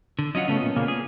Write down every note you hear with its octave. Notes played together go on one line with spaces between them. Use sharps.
D3
F#3 C#4 F4 D#5 F#5
C#3 A3 B3 C#4
A#2
A#2 C#3 A#3
G#4